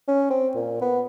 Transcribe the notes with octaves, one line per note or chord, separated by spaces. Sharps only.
C#4
C4
A#2
B3